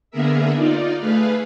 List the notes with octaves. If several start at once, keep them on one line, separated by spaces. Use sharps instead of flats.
D3 A#3 B3 G#4 A#4 E5
D#4 F4 D5
A3 G#4 B4 F5